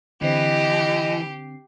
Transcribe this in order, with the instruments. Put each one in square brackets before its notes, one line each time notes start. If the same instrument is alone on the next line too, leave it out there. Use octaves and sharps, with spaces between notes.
[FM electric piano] D3 C4 C7 [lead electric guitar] E3 [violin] G4 [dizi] D#5